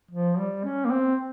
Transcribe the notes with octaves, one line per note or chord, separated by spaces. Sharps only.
F3
G3
C#4
A#3
C4